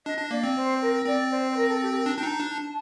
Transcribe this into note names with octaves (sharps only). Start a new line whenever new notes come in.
D4 D#5
D4
A#3 D5
C4
C5
A#4
C4 D5
C5
C5
A#4
A4
G4
A#4
D4 A5
D4 G5
D#4 A5
D4